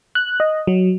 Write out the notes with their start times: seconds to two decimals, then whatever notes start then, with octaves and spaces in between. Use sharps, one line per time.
0.15 F#6
0.40 D#5
0.67 F#3